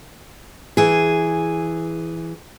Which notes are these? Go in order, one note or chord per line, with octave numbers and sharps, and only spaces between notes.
E3 G#4